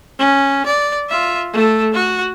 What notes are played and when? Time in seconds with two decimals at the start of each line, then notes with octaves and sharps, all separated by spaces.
0.19 C#4
0.66 D5
1.09 F4 E5
1.53 A3 A4
1.94 F#4